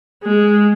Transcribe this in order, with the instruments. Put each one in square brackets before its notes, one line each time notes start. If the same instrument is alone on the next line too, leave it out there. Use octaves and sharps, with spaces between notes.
[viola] G#3